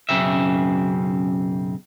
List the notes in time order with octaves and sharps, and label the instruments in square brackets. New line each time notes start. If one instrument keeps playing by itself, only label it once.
[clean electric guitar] B1 F#2 C#3 C4 E5